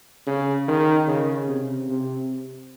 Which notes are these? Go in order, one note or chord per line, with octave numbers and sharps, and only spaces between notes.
C#3
D#3
C#3
C3
C3